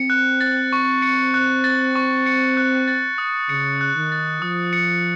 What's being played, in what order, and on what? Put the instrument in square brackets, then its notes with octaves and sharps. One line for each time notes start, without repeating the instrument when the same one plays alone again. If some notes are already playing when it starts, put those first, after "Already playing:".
Already playing: [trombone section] C4 [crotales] C#7
[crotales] F#6
A6
C#6
C#7
F#6
A6
C#6
C#7
F#6
A6
D#6
[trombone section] C#3 [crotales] C#7
[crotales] F#6
[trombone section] D#3
[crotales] A6
[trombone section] F3 [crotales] D#6
[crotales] C#7